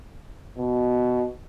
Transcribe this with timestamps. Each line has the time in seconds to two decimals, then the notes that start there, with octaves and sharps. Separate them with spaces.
0.58 B2